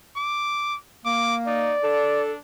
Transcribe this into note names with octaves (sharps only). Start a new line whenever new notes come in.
D6
A#3 D6
D#4 D5
D4 A4